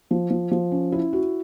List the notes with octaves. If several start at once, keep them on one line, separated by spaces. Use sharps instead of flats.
F3
F3
F3
C#4
E4
F#4